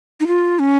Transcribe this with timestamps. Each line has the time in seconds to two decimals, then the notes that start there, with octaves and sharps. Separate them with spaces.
0.20 D#4
0.27 F4
0.59 C#4